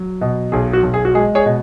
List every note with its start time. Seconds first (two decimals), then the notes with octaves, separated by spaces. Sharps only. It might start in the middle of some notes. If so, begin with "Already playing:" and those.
Already playing: F#3
0.21 B2
0.52 B1 G#4
0.73 F#4
0.83 B1
0.94 G#4
1.05 F#4
1.14 G#3 G#4
1.35 G#4 C#5
1.46 B2